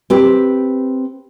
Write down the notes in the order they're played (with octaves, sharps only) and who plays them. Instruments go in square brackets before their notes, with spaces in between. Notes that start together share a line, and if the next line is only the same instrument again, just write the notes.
[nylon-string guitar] C4 G4 B4